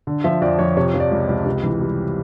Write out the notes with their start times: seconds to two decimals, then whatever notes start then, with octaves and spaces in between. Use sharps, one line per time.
0.07 D3
0.24 F3 E5
0.42 F2 D5
0.59 F2 C#5
0.77 C3 C#5
0.94 F3
1.00 D5
1.11 C#2
1.29 C#2
1.46 C3
1.63 E3
1.81 G3